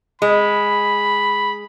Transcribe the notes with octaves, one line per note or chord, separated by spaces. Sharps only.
G#3 B5